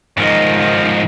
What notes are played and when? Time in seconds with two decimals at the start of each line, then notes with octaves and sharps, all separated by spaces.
0.18 G#2 D#3 F3 D#5